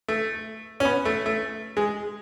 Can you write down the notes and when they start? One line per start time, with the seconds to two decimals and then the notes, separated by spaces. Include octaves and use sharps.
0.08 A3
0.80 C#4
0.85 B3
1.05 A3
1.26 A3
1.77 G#3